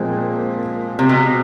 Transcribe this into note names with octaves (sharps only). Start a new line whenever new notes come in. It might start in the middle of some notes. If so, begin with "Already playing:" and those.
Already playing: A#2 F3 G#3 C4
C3
B2